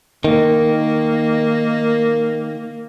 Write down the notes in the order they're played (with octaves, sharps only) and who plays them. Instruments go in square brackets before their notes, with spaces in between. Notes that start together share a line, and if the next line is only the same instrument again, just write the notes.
[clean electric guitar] D#3 [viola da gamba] A#3